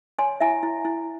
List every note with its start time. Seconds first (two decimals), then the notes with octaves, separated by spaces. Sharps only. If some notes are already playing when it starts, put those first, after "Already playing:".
0.19 C#5 G#5 C6
0.40 E4 E5 G#5
0.63 E4
0.85 E4